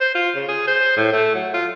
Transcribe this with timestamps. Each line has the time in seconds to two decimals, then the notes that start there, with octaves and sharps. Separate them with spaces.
0.01 C5
0.15 F4
0.35 C#3
0.48 G#4
0.67 C5
0.97 A2
1.12 A3
1.35 F#3
1.54 F4